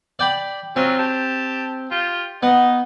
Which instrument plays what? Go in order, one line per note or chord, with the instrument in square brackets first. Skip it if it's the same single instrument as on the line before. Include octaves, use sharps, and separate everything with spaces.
[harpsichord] D5 G5 B5
[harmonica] F#3 C#4 F4 [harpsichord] C4
[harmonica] G4 A5
F4 G4
[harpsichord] B3 [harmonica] D#4